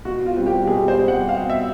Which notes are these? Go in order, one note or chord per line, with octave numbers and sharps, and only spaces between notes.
B2 F#4
F4
G3 C4
G4
B2 G#4
C5
G3 C4
F#5
B2 F5
E5